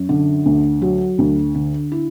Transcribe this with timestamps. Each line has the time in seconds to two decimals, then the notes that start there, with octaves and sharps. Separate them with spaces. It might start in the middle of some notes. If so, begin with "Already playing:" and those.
Already playing: F#2
0.09 D3
0.45 D2
0.82 F#3
1.18 D2
1.55 D3
1.92 E4